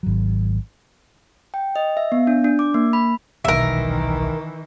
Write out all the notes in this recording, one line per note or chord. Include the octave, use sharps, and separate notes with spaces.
G#1 F#3
G5
D#5
E5
B3
D4
D4
D6
A#3
B5
D#1 B1 D#3 E3 A#4 E5